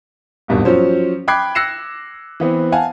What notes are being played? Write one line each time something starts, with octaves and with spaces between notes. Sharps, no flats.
D#1 G#1 G2 B2
F3 F#3 C#4 C5
G5 B5 D6 F#6 G#6 C7
E6 F#6 A#6 C7 C#7 E7
E3 B3 C4
F5 F#5 G#5 A5